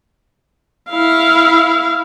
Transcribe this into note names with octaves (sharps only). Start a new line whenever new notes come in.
E4 F5